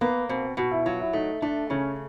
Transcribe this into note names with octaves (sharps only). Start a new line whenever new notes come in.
A#3 B3
B2 C4
B2 F#4
E4
F#3 F4
E4
A3 D#4
A3 D4
C#3 C#4